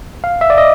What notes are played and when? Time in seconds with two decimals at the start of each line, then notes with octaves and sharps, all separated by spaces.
0.24 F5
0.41 E5
0.50 D5
0.58 D#5